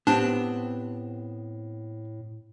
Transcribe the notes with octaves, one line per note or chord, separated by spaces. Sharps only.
A2 B3 C4 D4 G4 A5